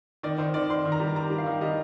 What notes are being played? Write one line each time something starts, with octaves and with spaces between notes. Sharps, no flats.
D#3 D5
D#3 C5
D#3 D5
D#3 C6
D#3
A#5
G3
G3 A#5
G3
F5
D#3
G3 D#5